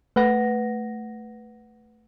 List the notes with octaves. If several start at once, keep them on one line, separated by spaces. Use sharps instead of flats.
A3 B4 F#5 A#6